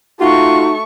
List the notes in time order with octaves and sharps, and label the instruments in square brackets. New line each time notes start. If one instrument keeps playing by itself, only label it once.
[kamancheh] A3 C#6 [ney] D#4 [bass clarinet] F4 [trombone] F#4